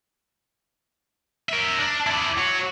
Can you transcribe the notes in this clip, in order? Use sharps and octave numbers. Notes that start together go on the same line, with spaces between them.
A#4 E5
D4
E4 D5
F#4 C#5